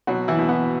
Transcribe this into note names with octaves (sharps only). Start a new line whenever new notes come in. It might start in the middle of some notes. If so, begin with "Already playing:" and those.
B2 F#3 F#4
E3 E4
B2
B3